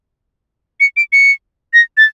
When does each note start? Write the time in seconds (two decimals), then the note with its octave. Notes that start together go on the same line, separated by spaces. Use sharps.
0.80 C#7
0.97 D7
1.13 C#7
1.74 A#6
1.97 A6